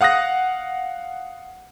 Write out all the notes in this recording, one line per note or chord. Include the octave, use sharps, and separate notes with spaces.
F5 F#5 D#6 F#6 A#6